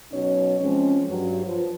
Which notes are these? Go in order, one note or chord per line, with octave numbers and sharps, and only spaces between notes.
B2 F#3 C#4 D#4 C#5
F3 G#3 C4 C#4
G2 F#3
F3 B4